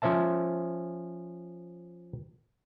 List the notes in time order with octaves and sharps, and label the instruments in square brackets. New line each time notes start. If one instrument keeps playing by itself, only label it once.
[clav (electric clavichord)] F3 C#4 C5 E5 A5